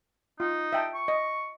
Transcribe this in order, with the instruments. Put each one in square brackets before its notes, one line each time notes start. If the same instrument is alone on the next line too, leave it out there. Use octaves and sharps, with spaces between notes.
[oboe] D#4 [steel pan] F4
[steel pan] E5 G5 A5
[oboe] C#6
[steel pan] D#5